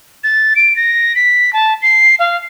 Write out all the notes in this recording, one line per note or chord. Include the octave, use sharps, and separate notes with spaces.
A6
D7
A#6
B6
A5
C7
F5